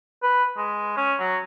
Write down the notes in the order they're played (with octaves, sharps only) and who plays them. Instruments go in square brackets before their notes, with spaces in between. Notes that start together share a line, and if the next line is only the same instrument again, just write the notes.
[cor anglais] B4
G#3
C#4
F#3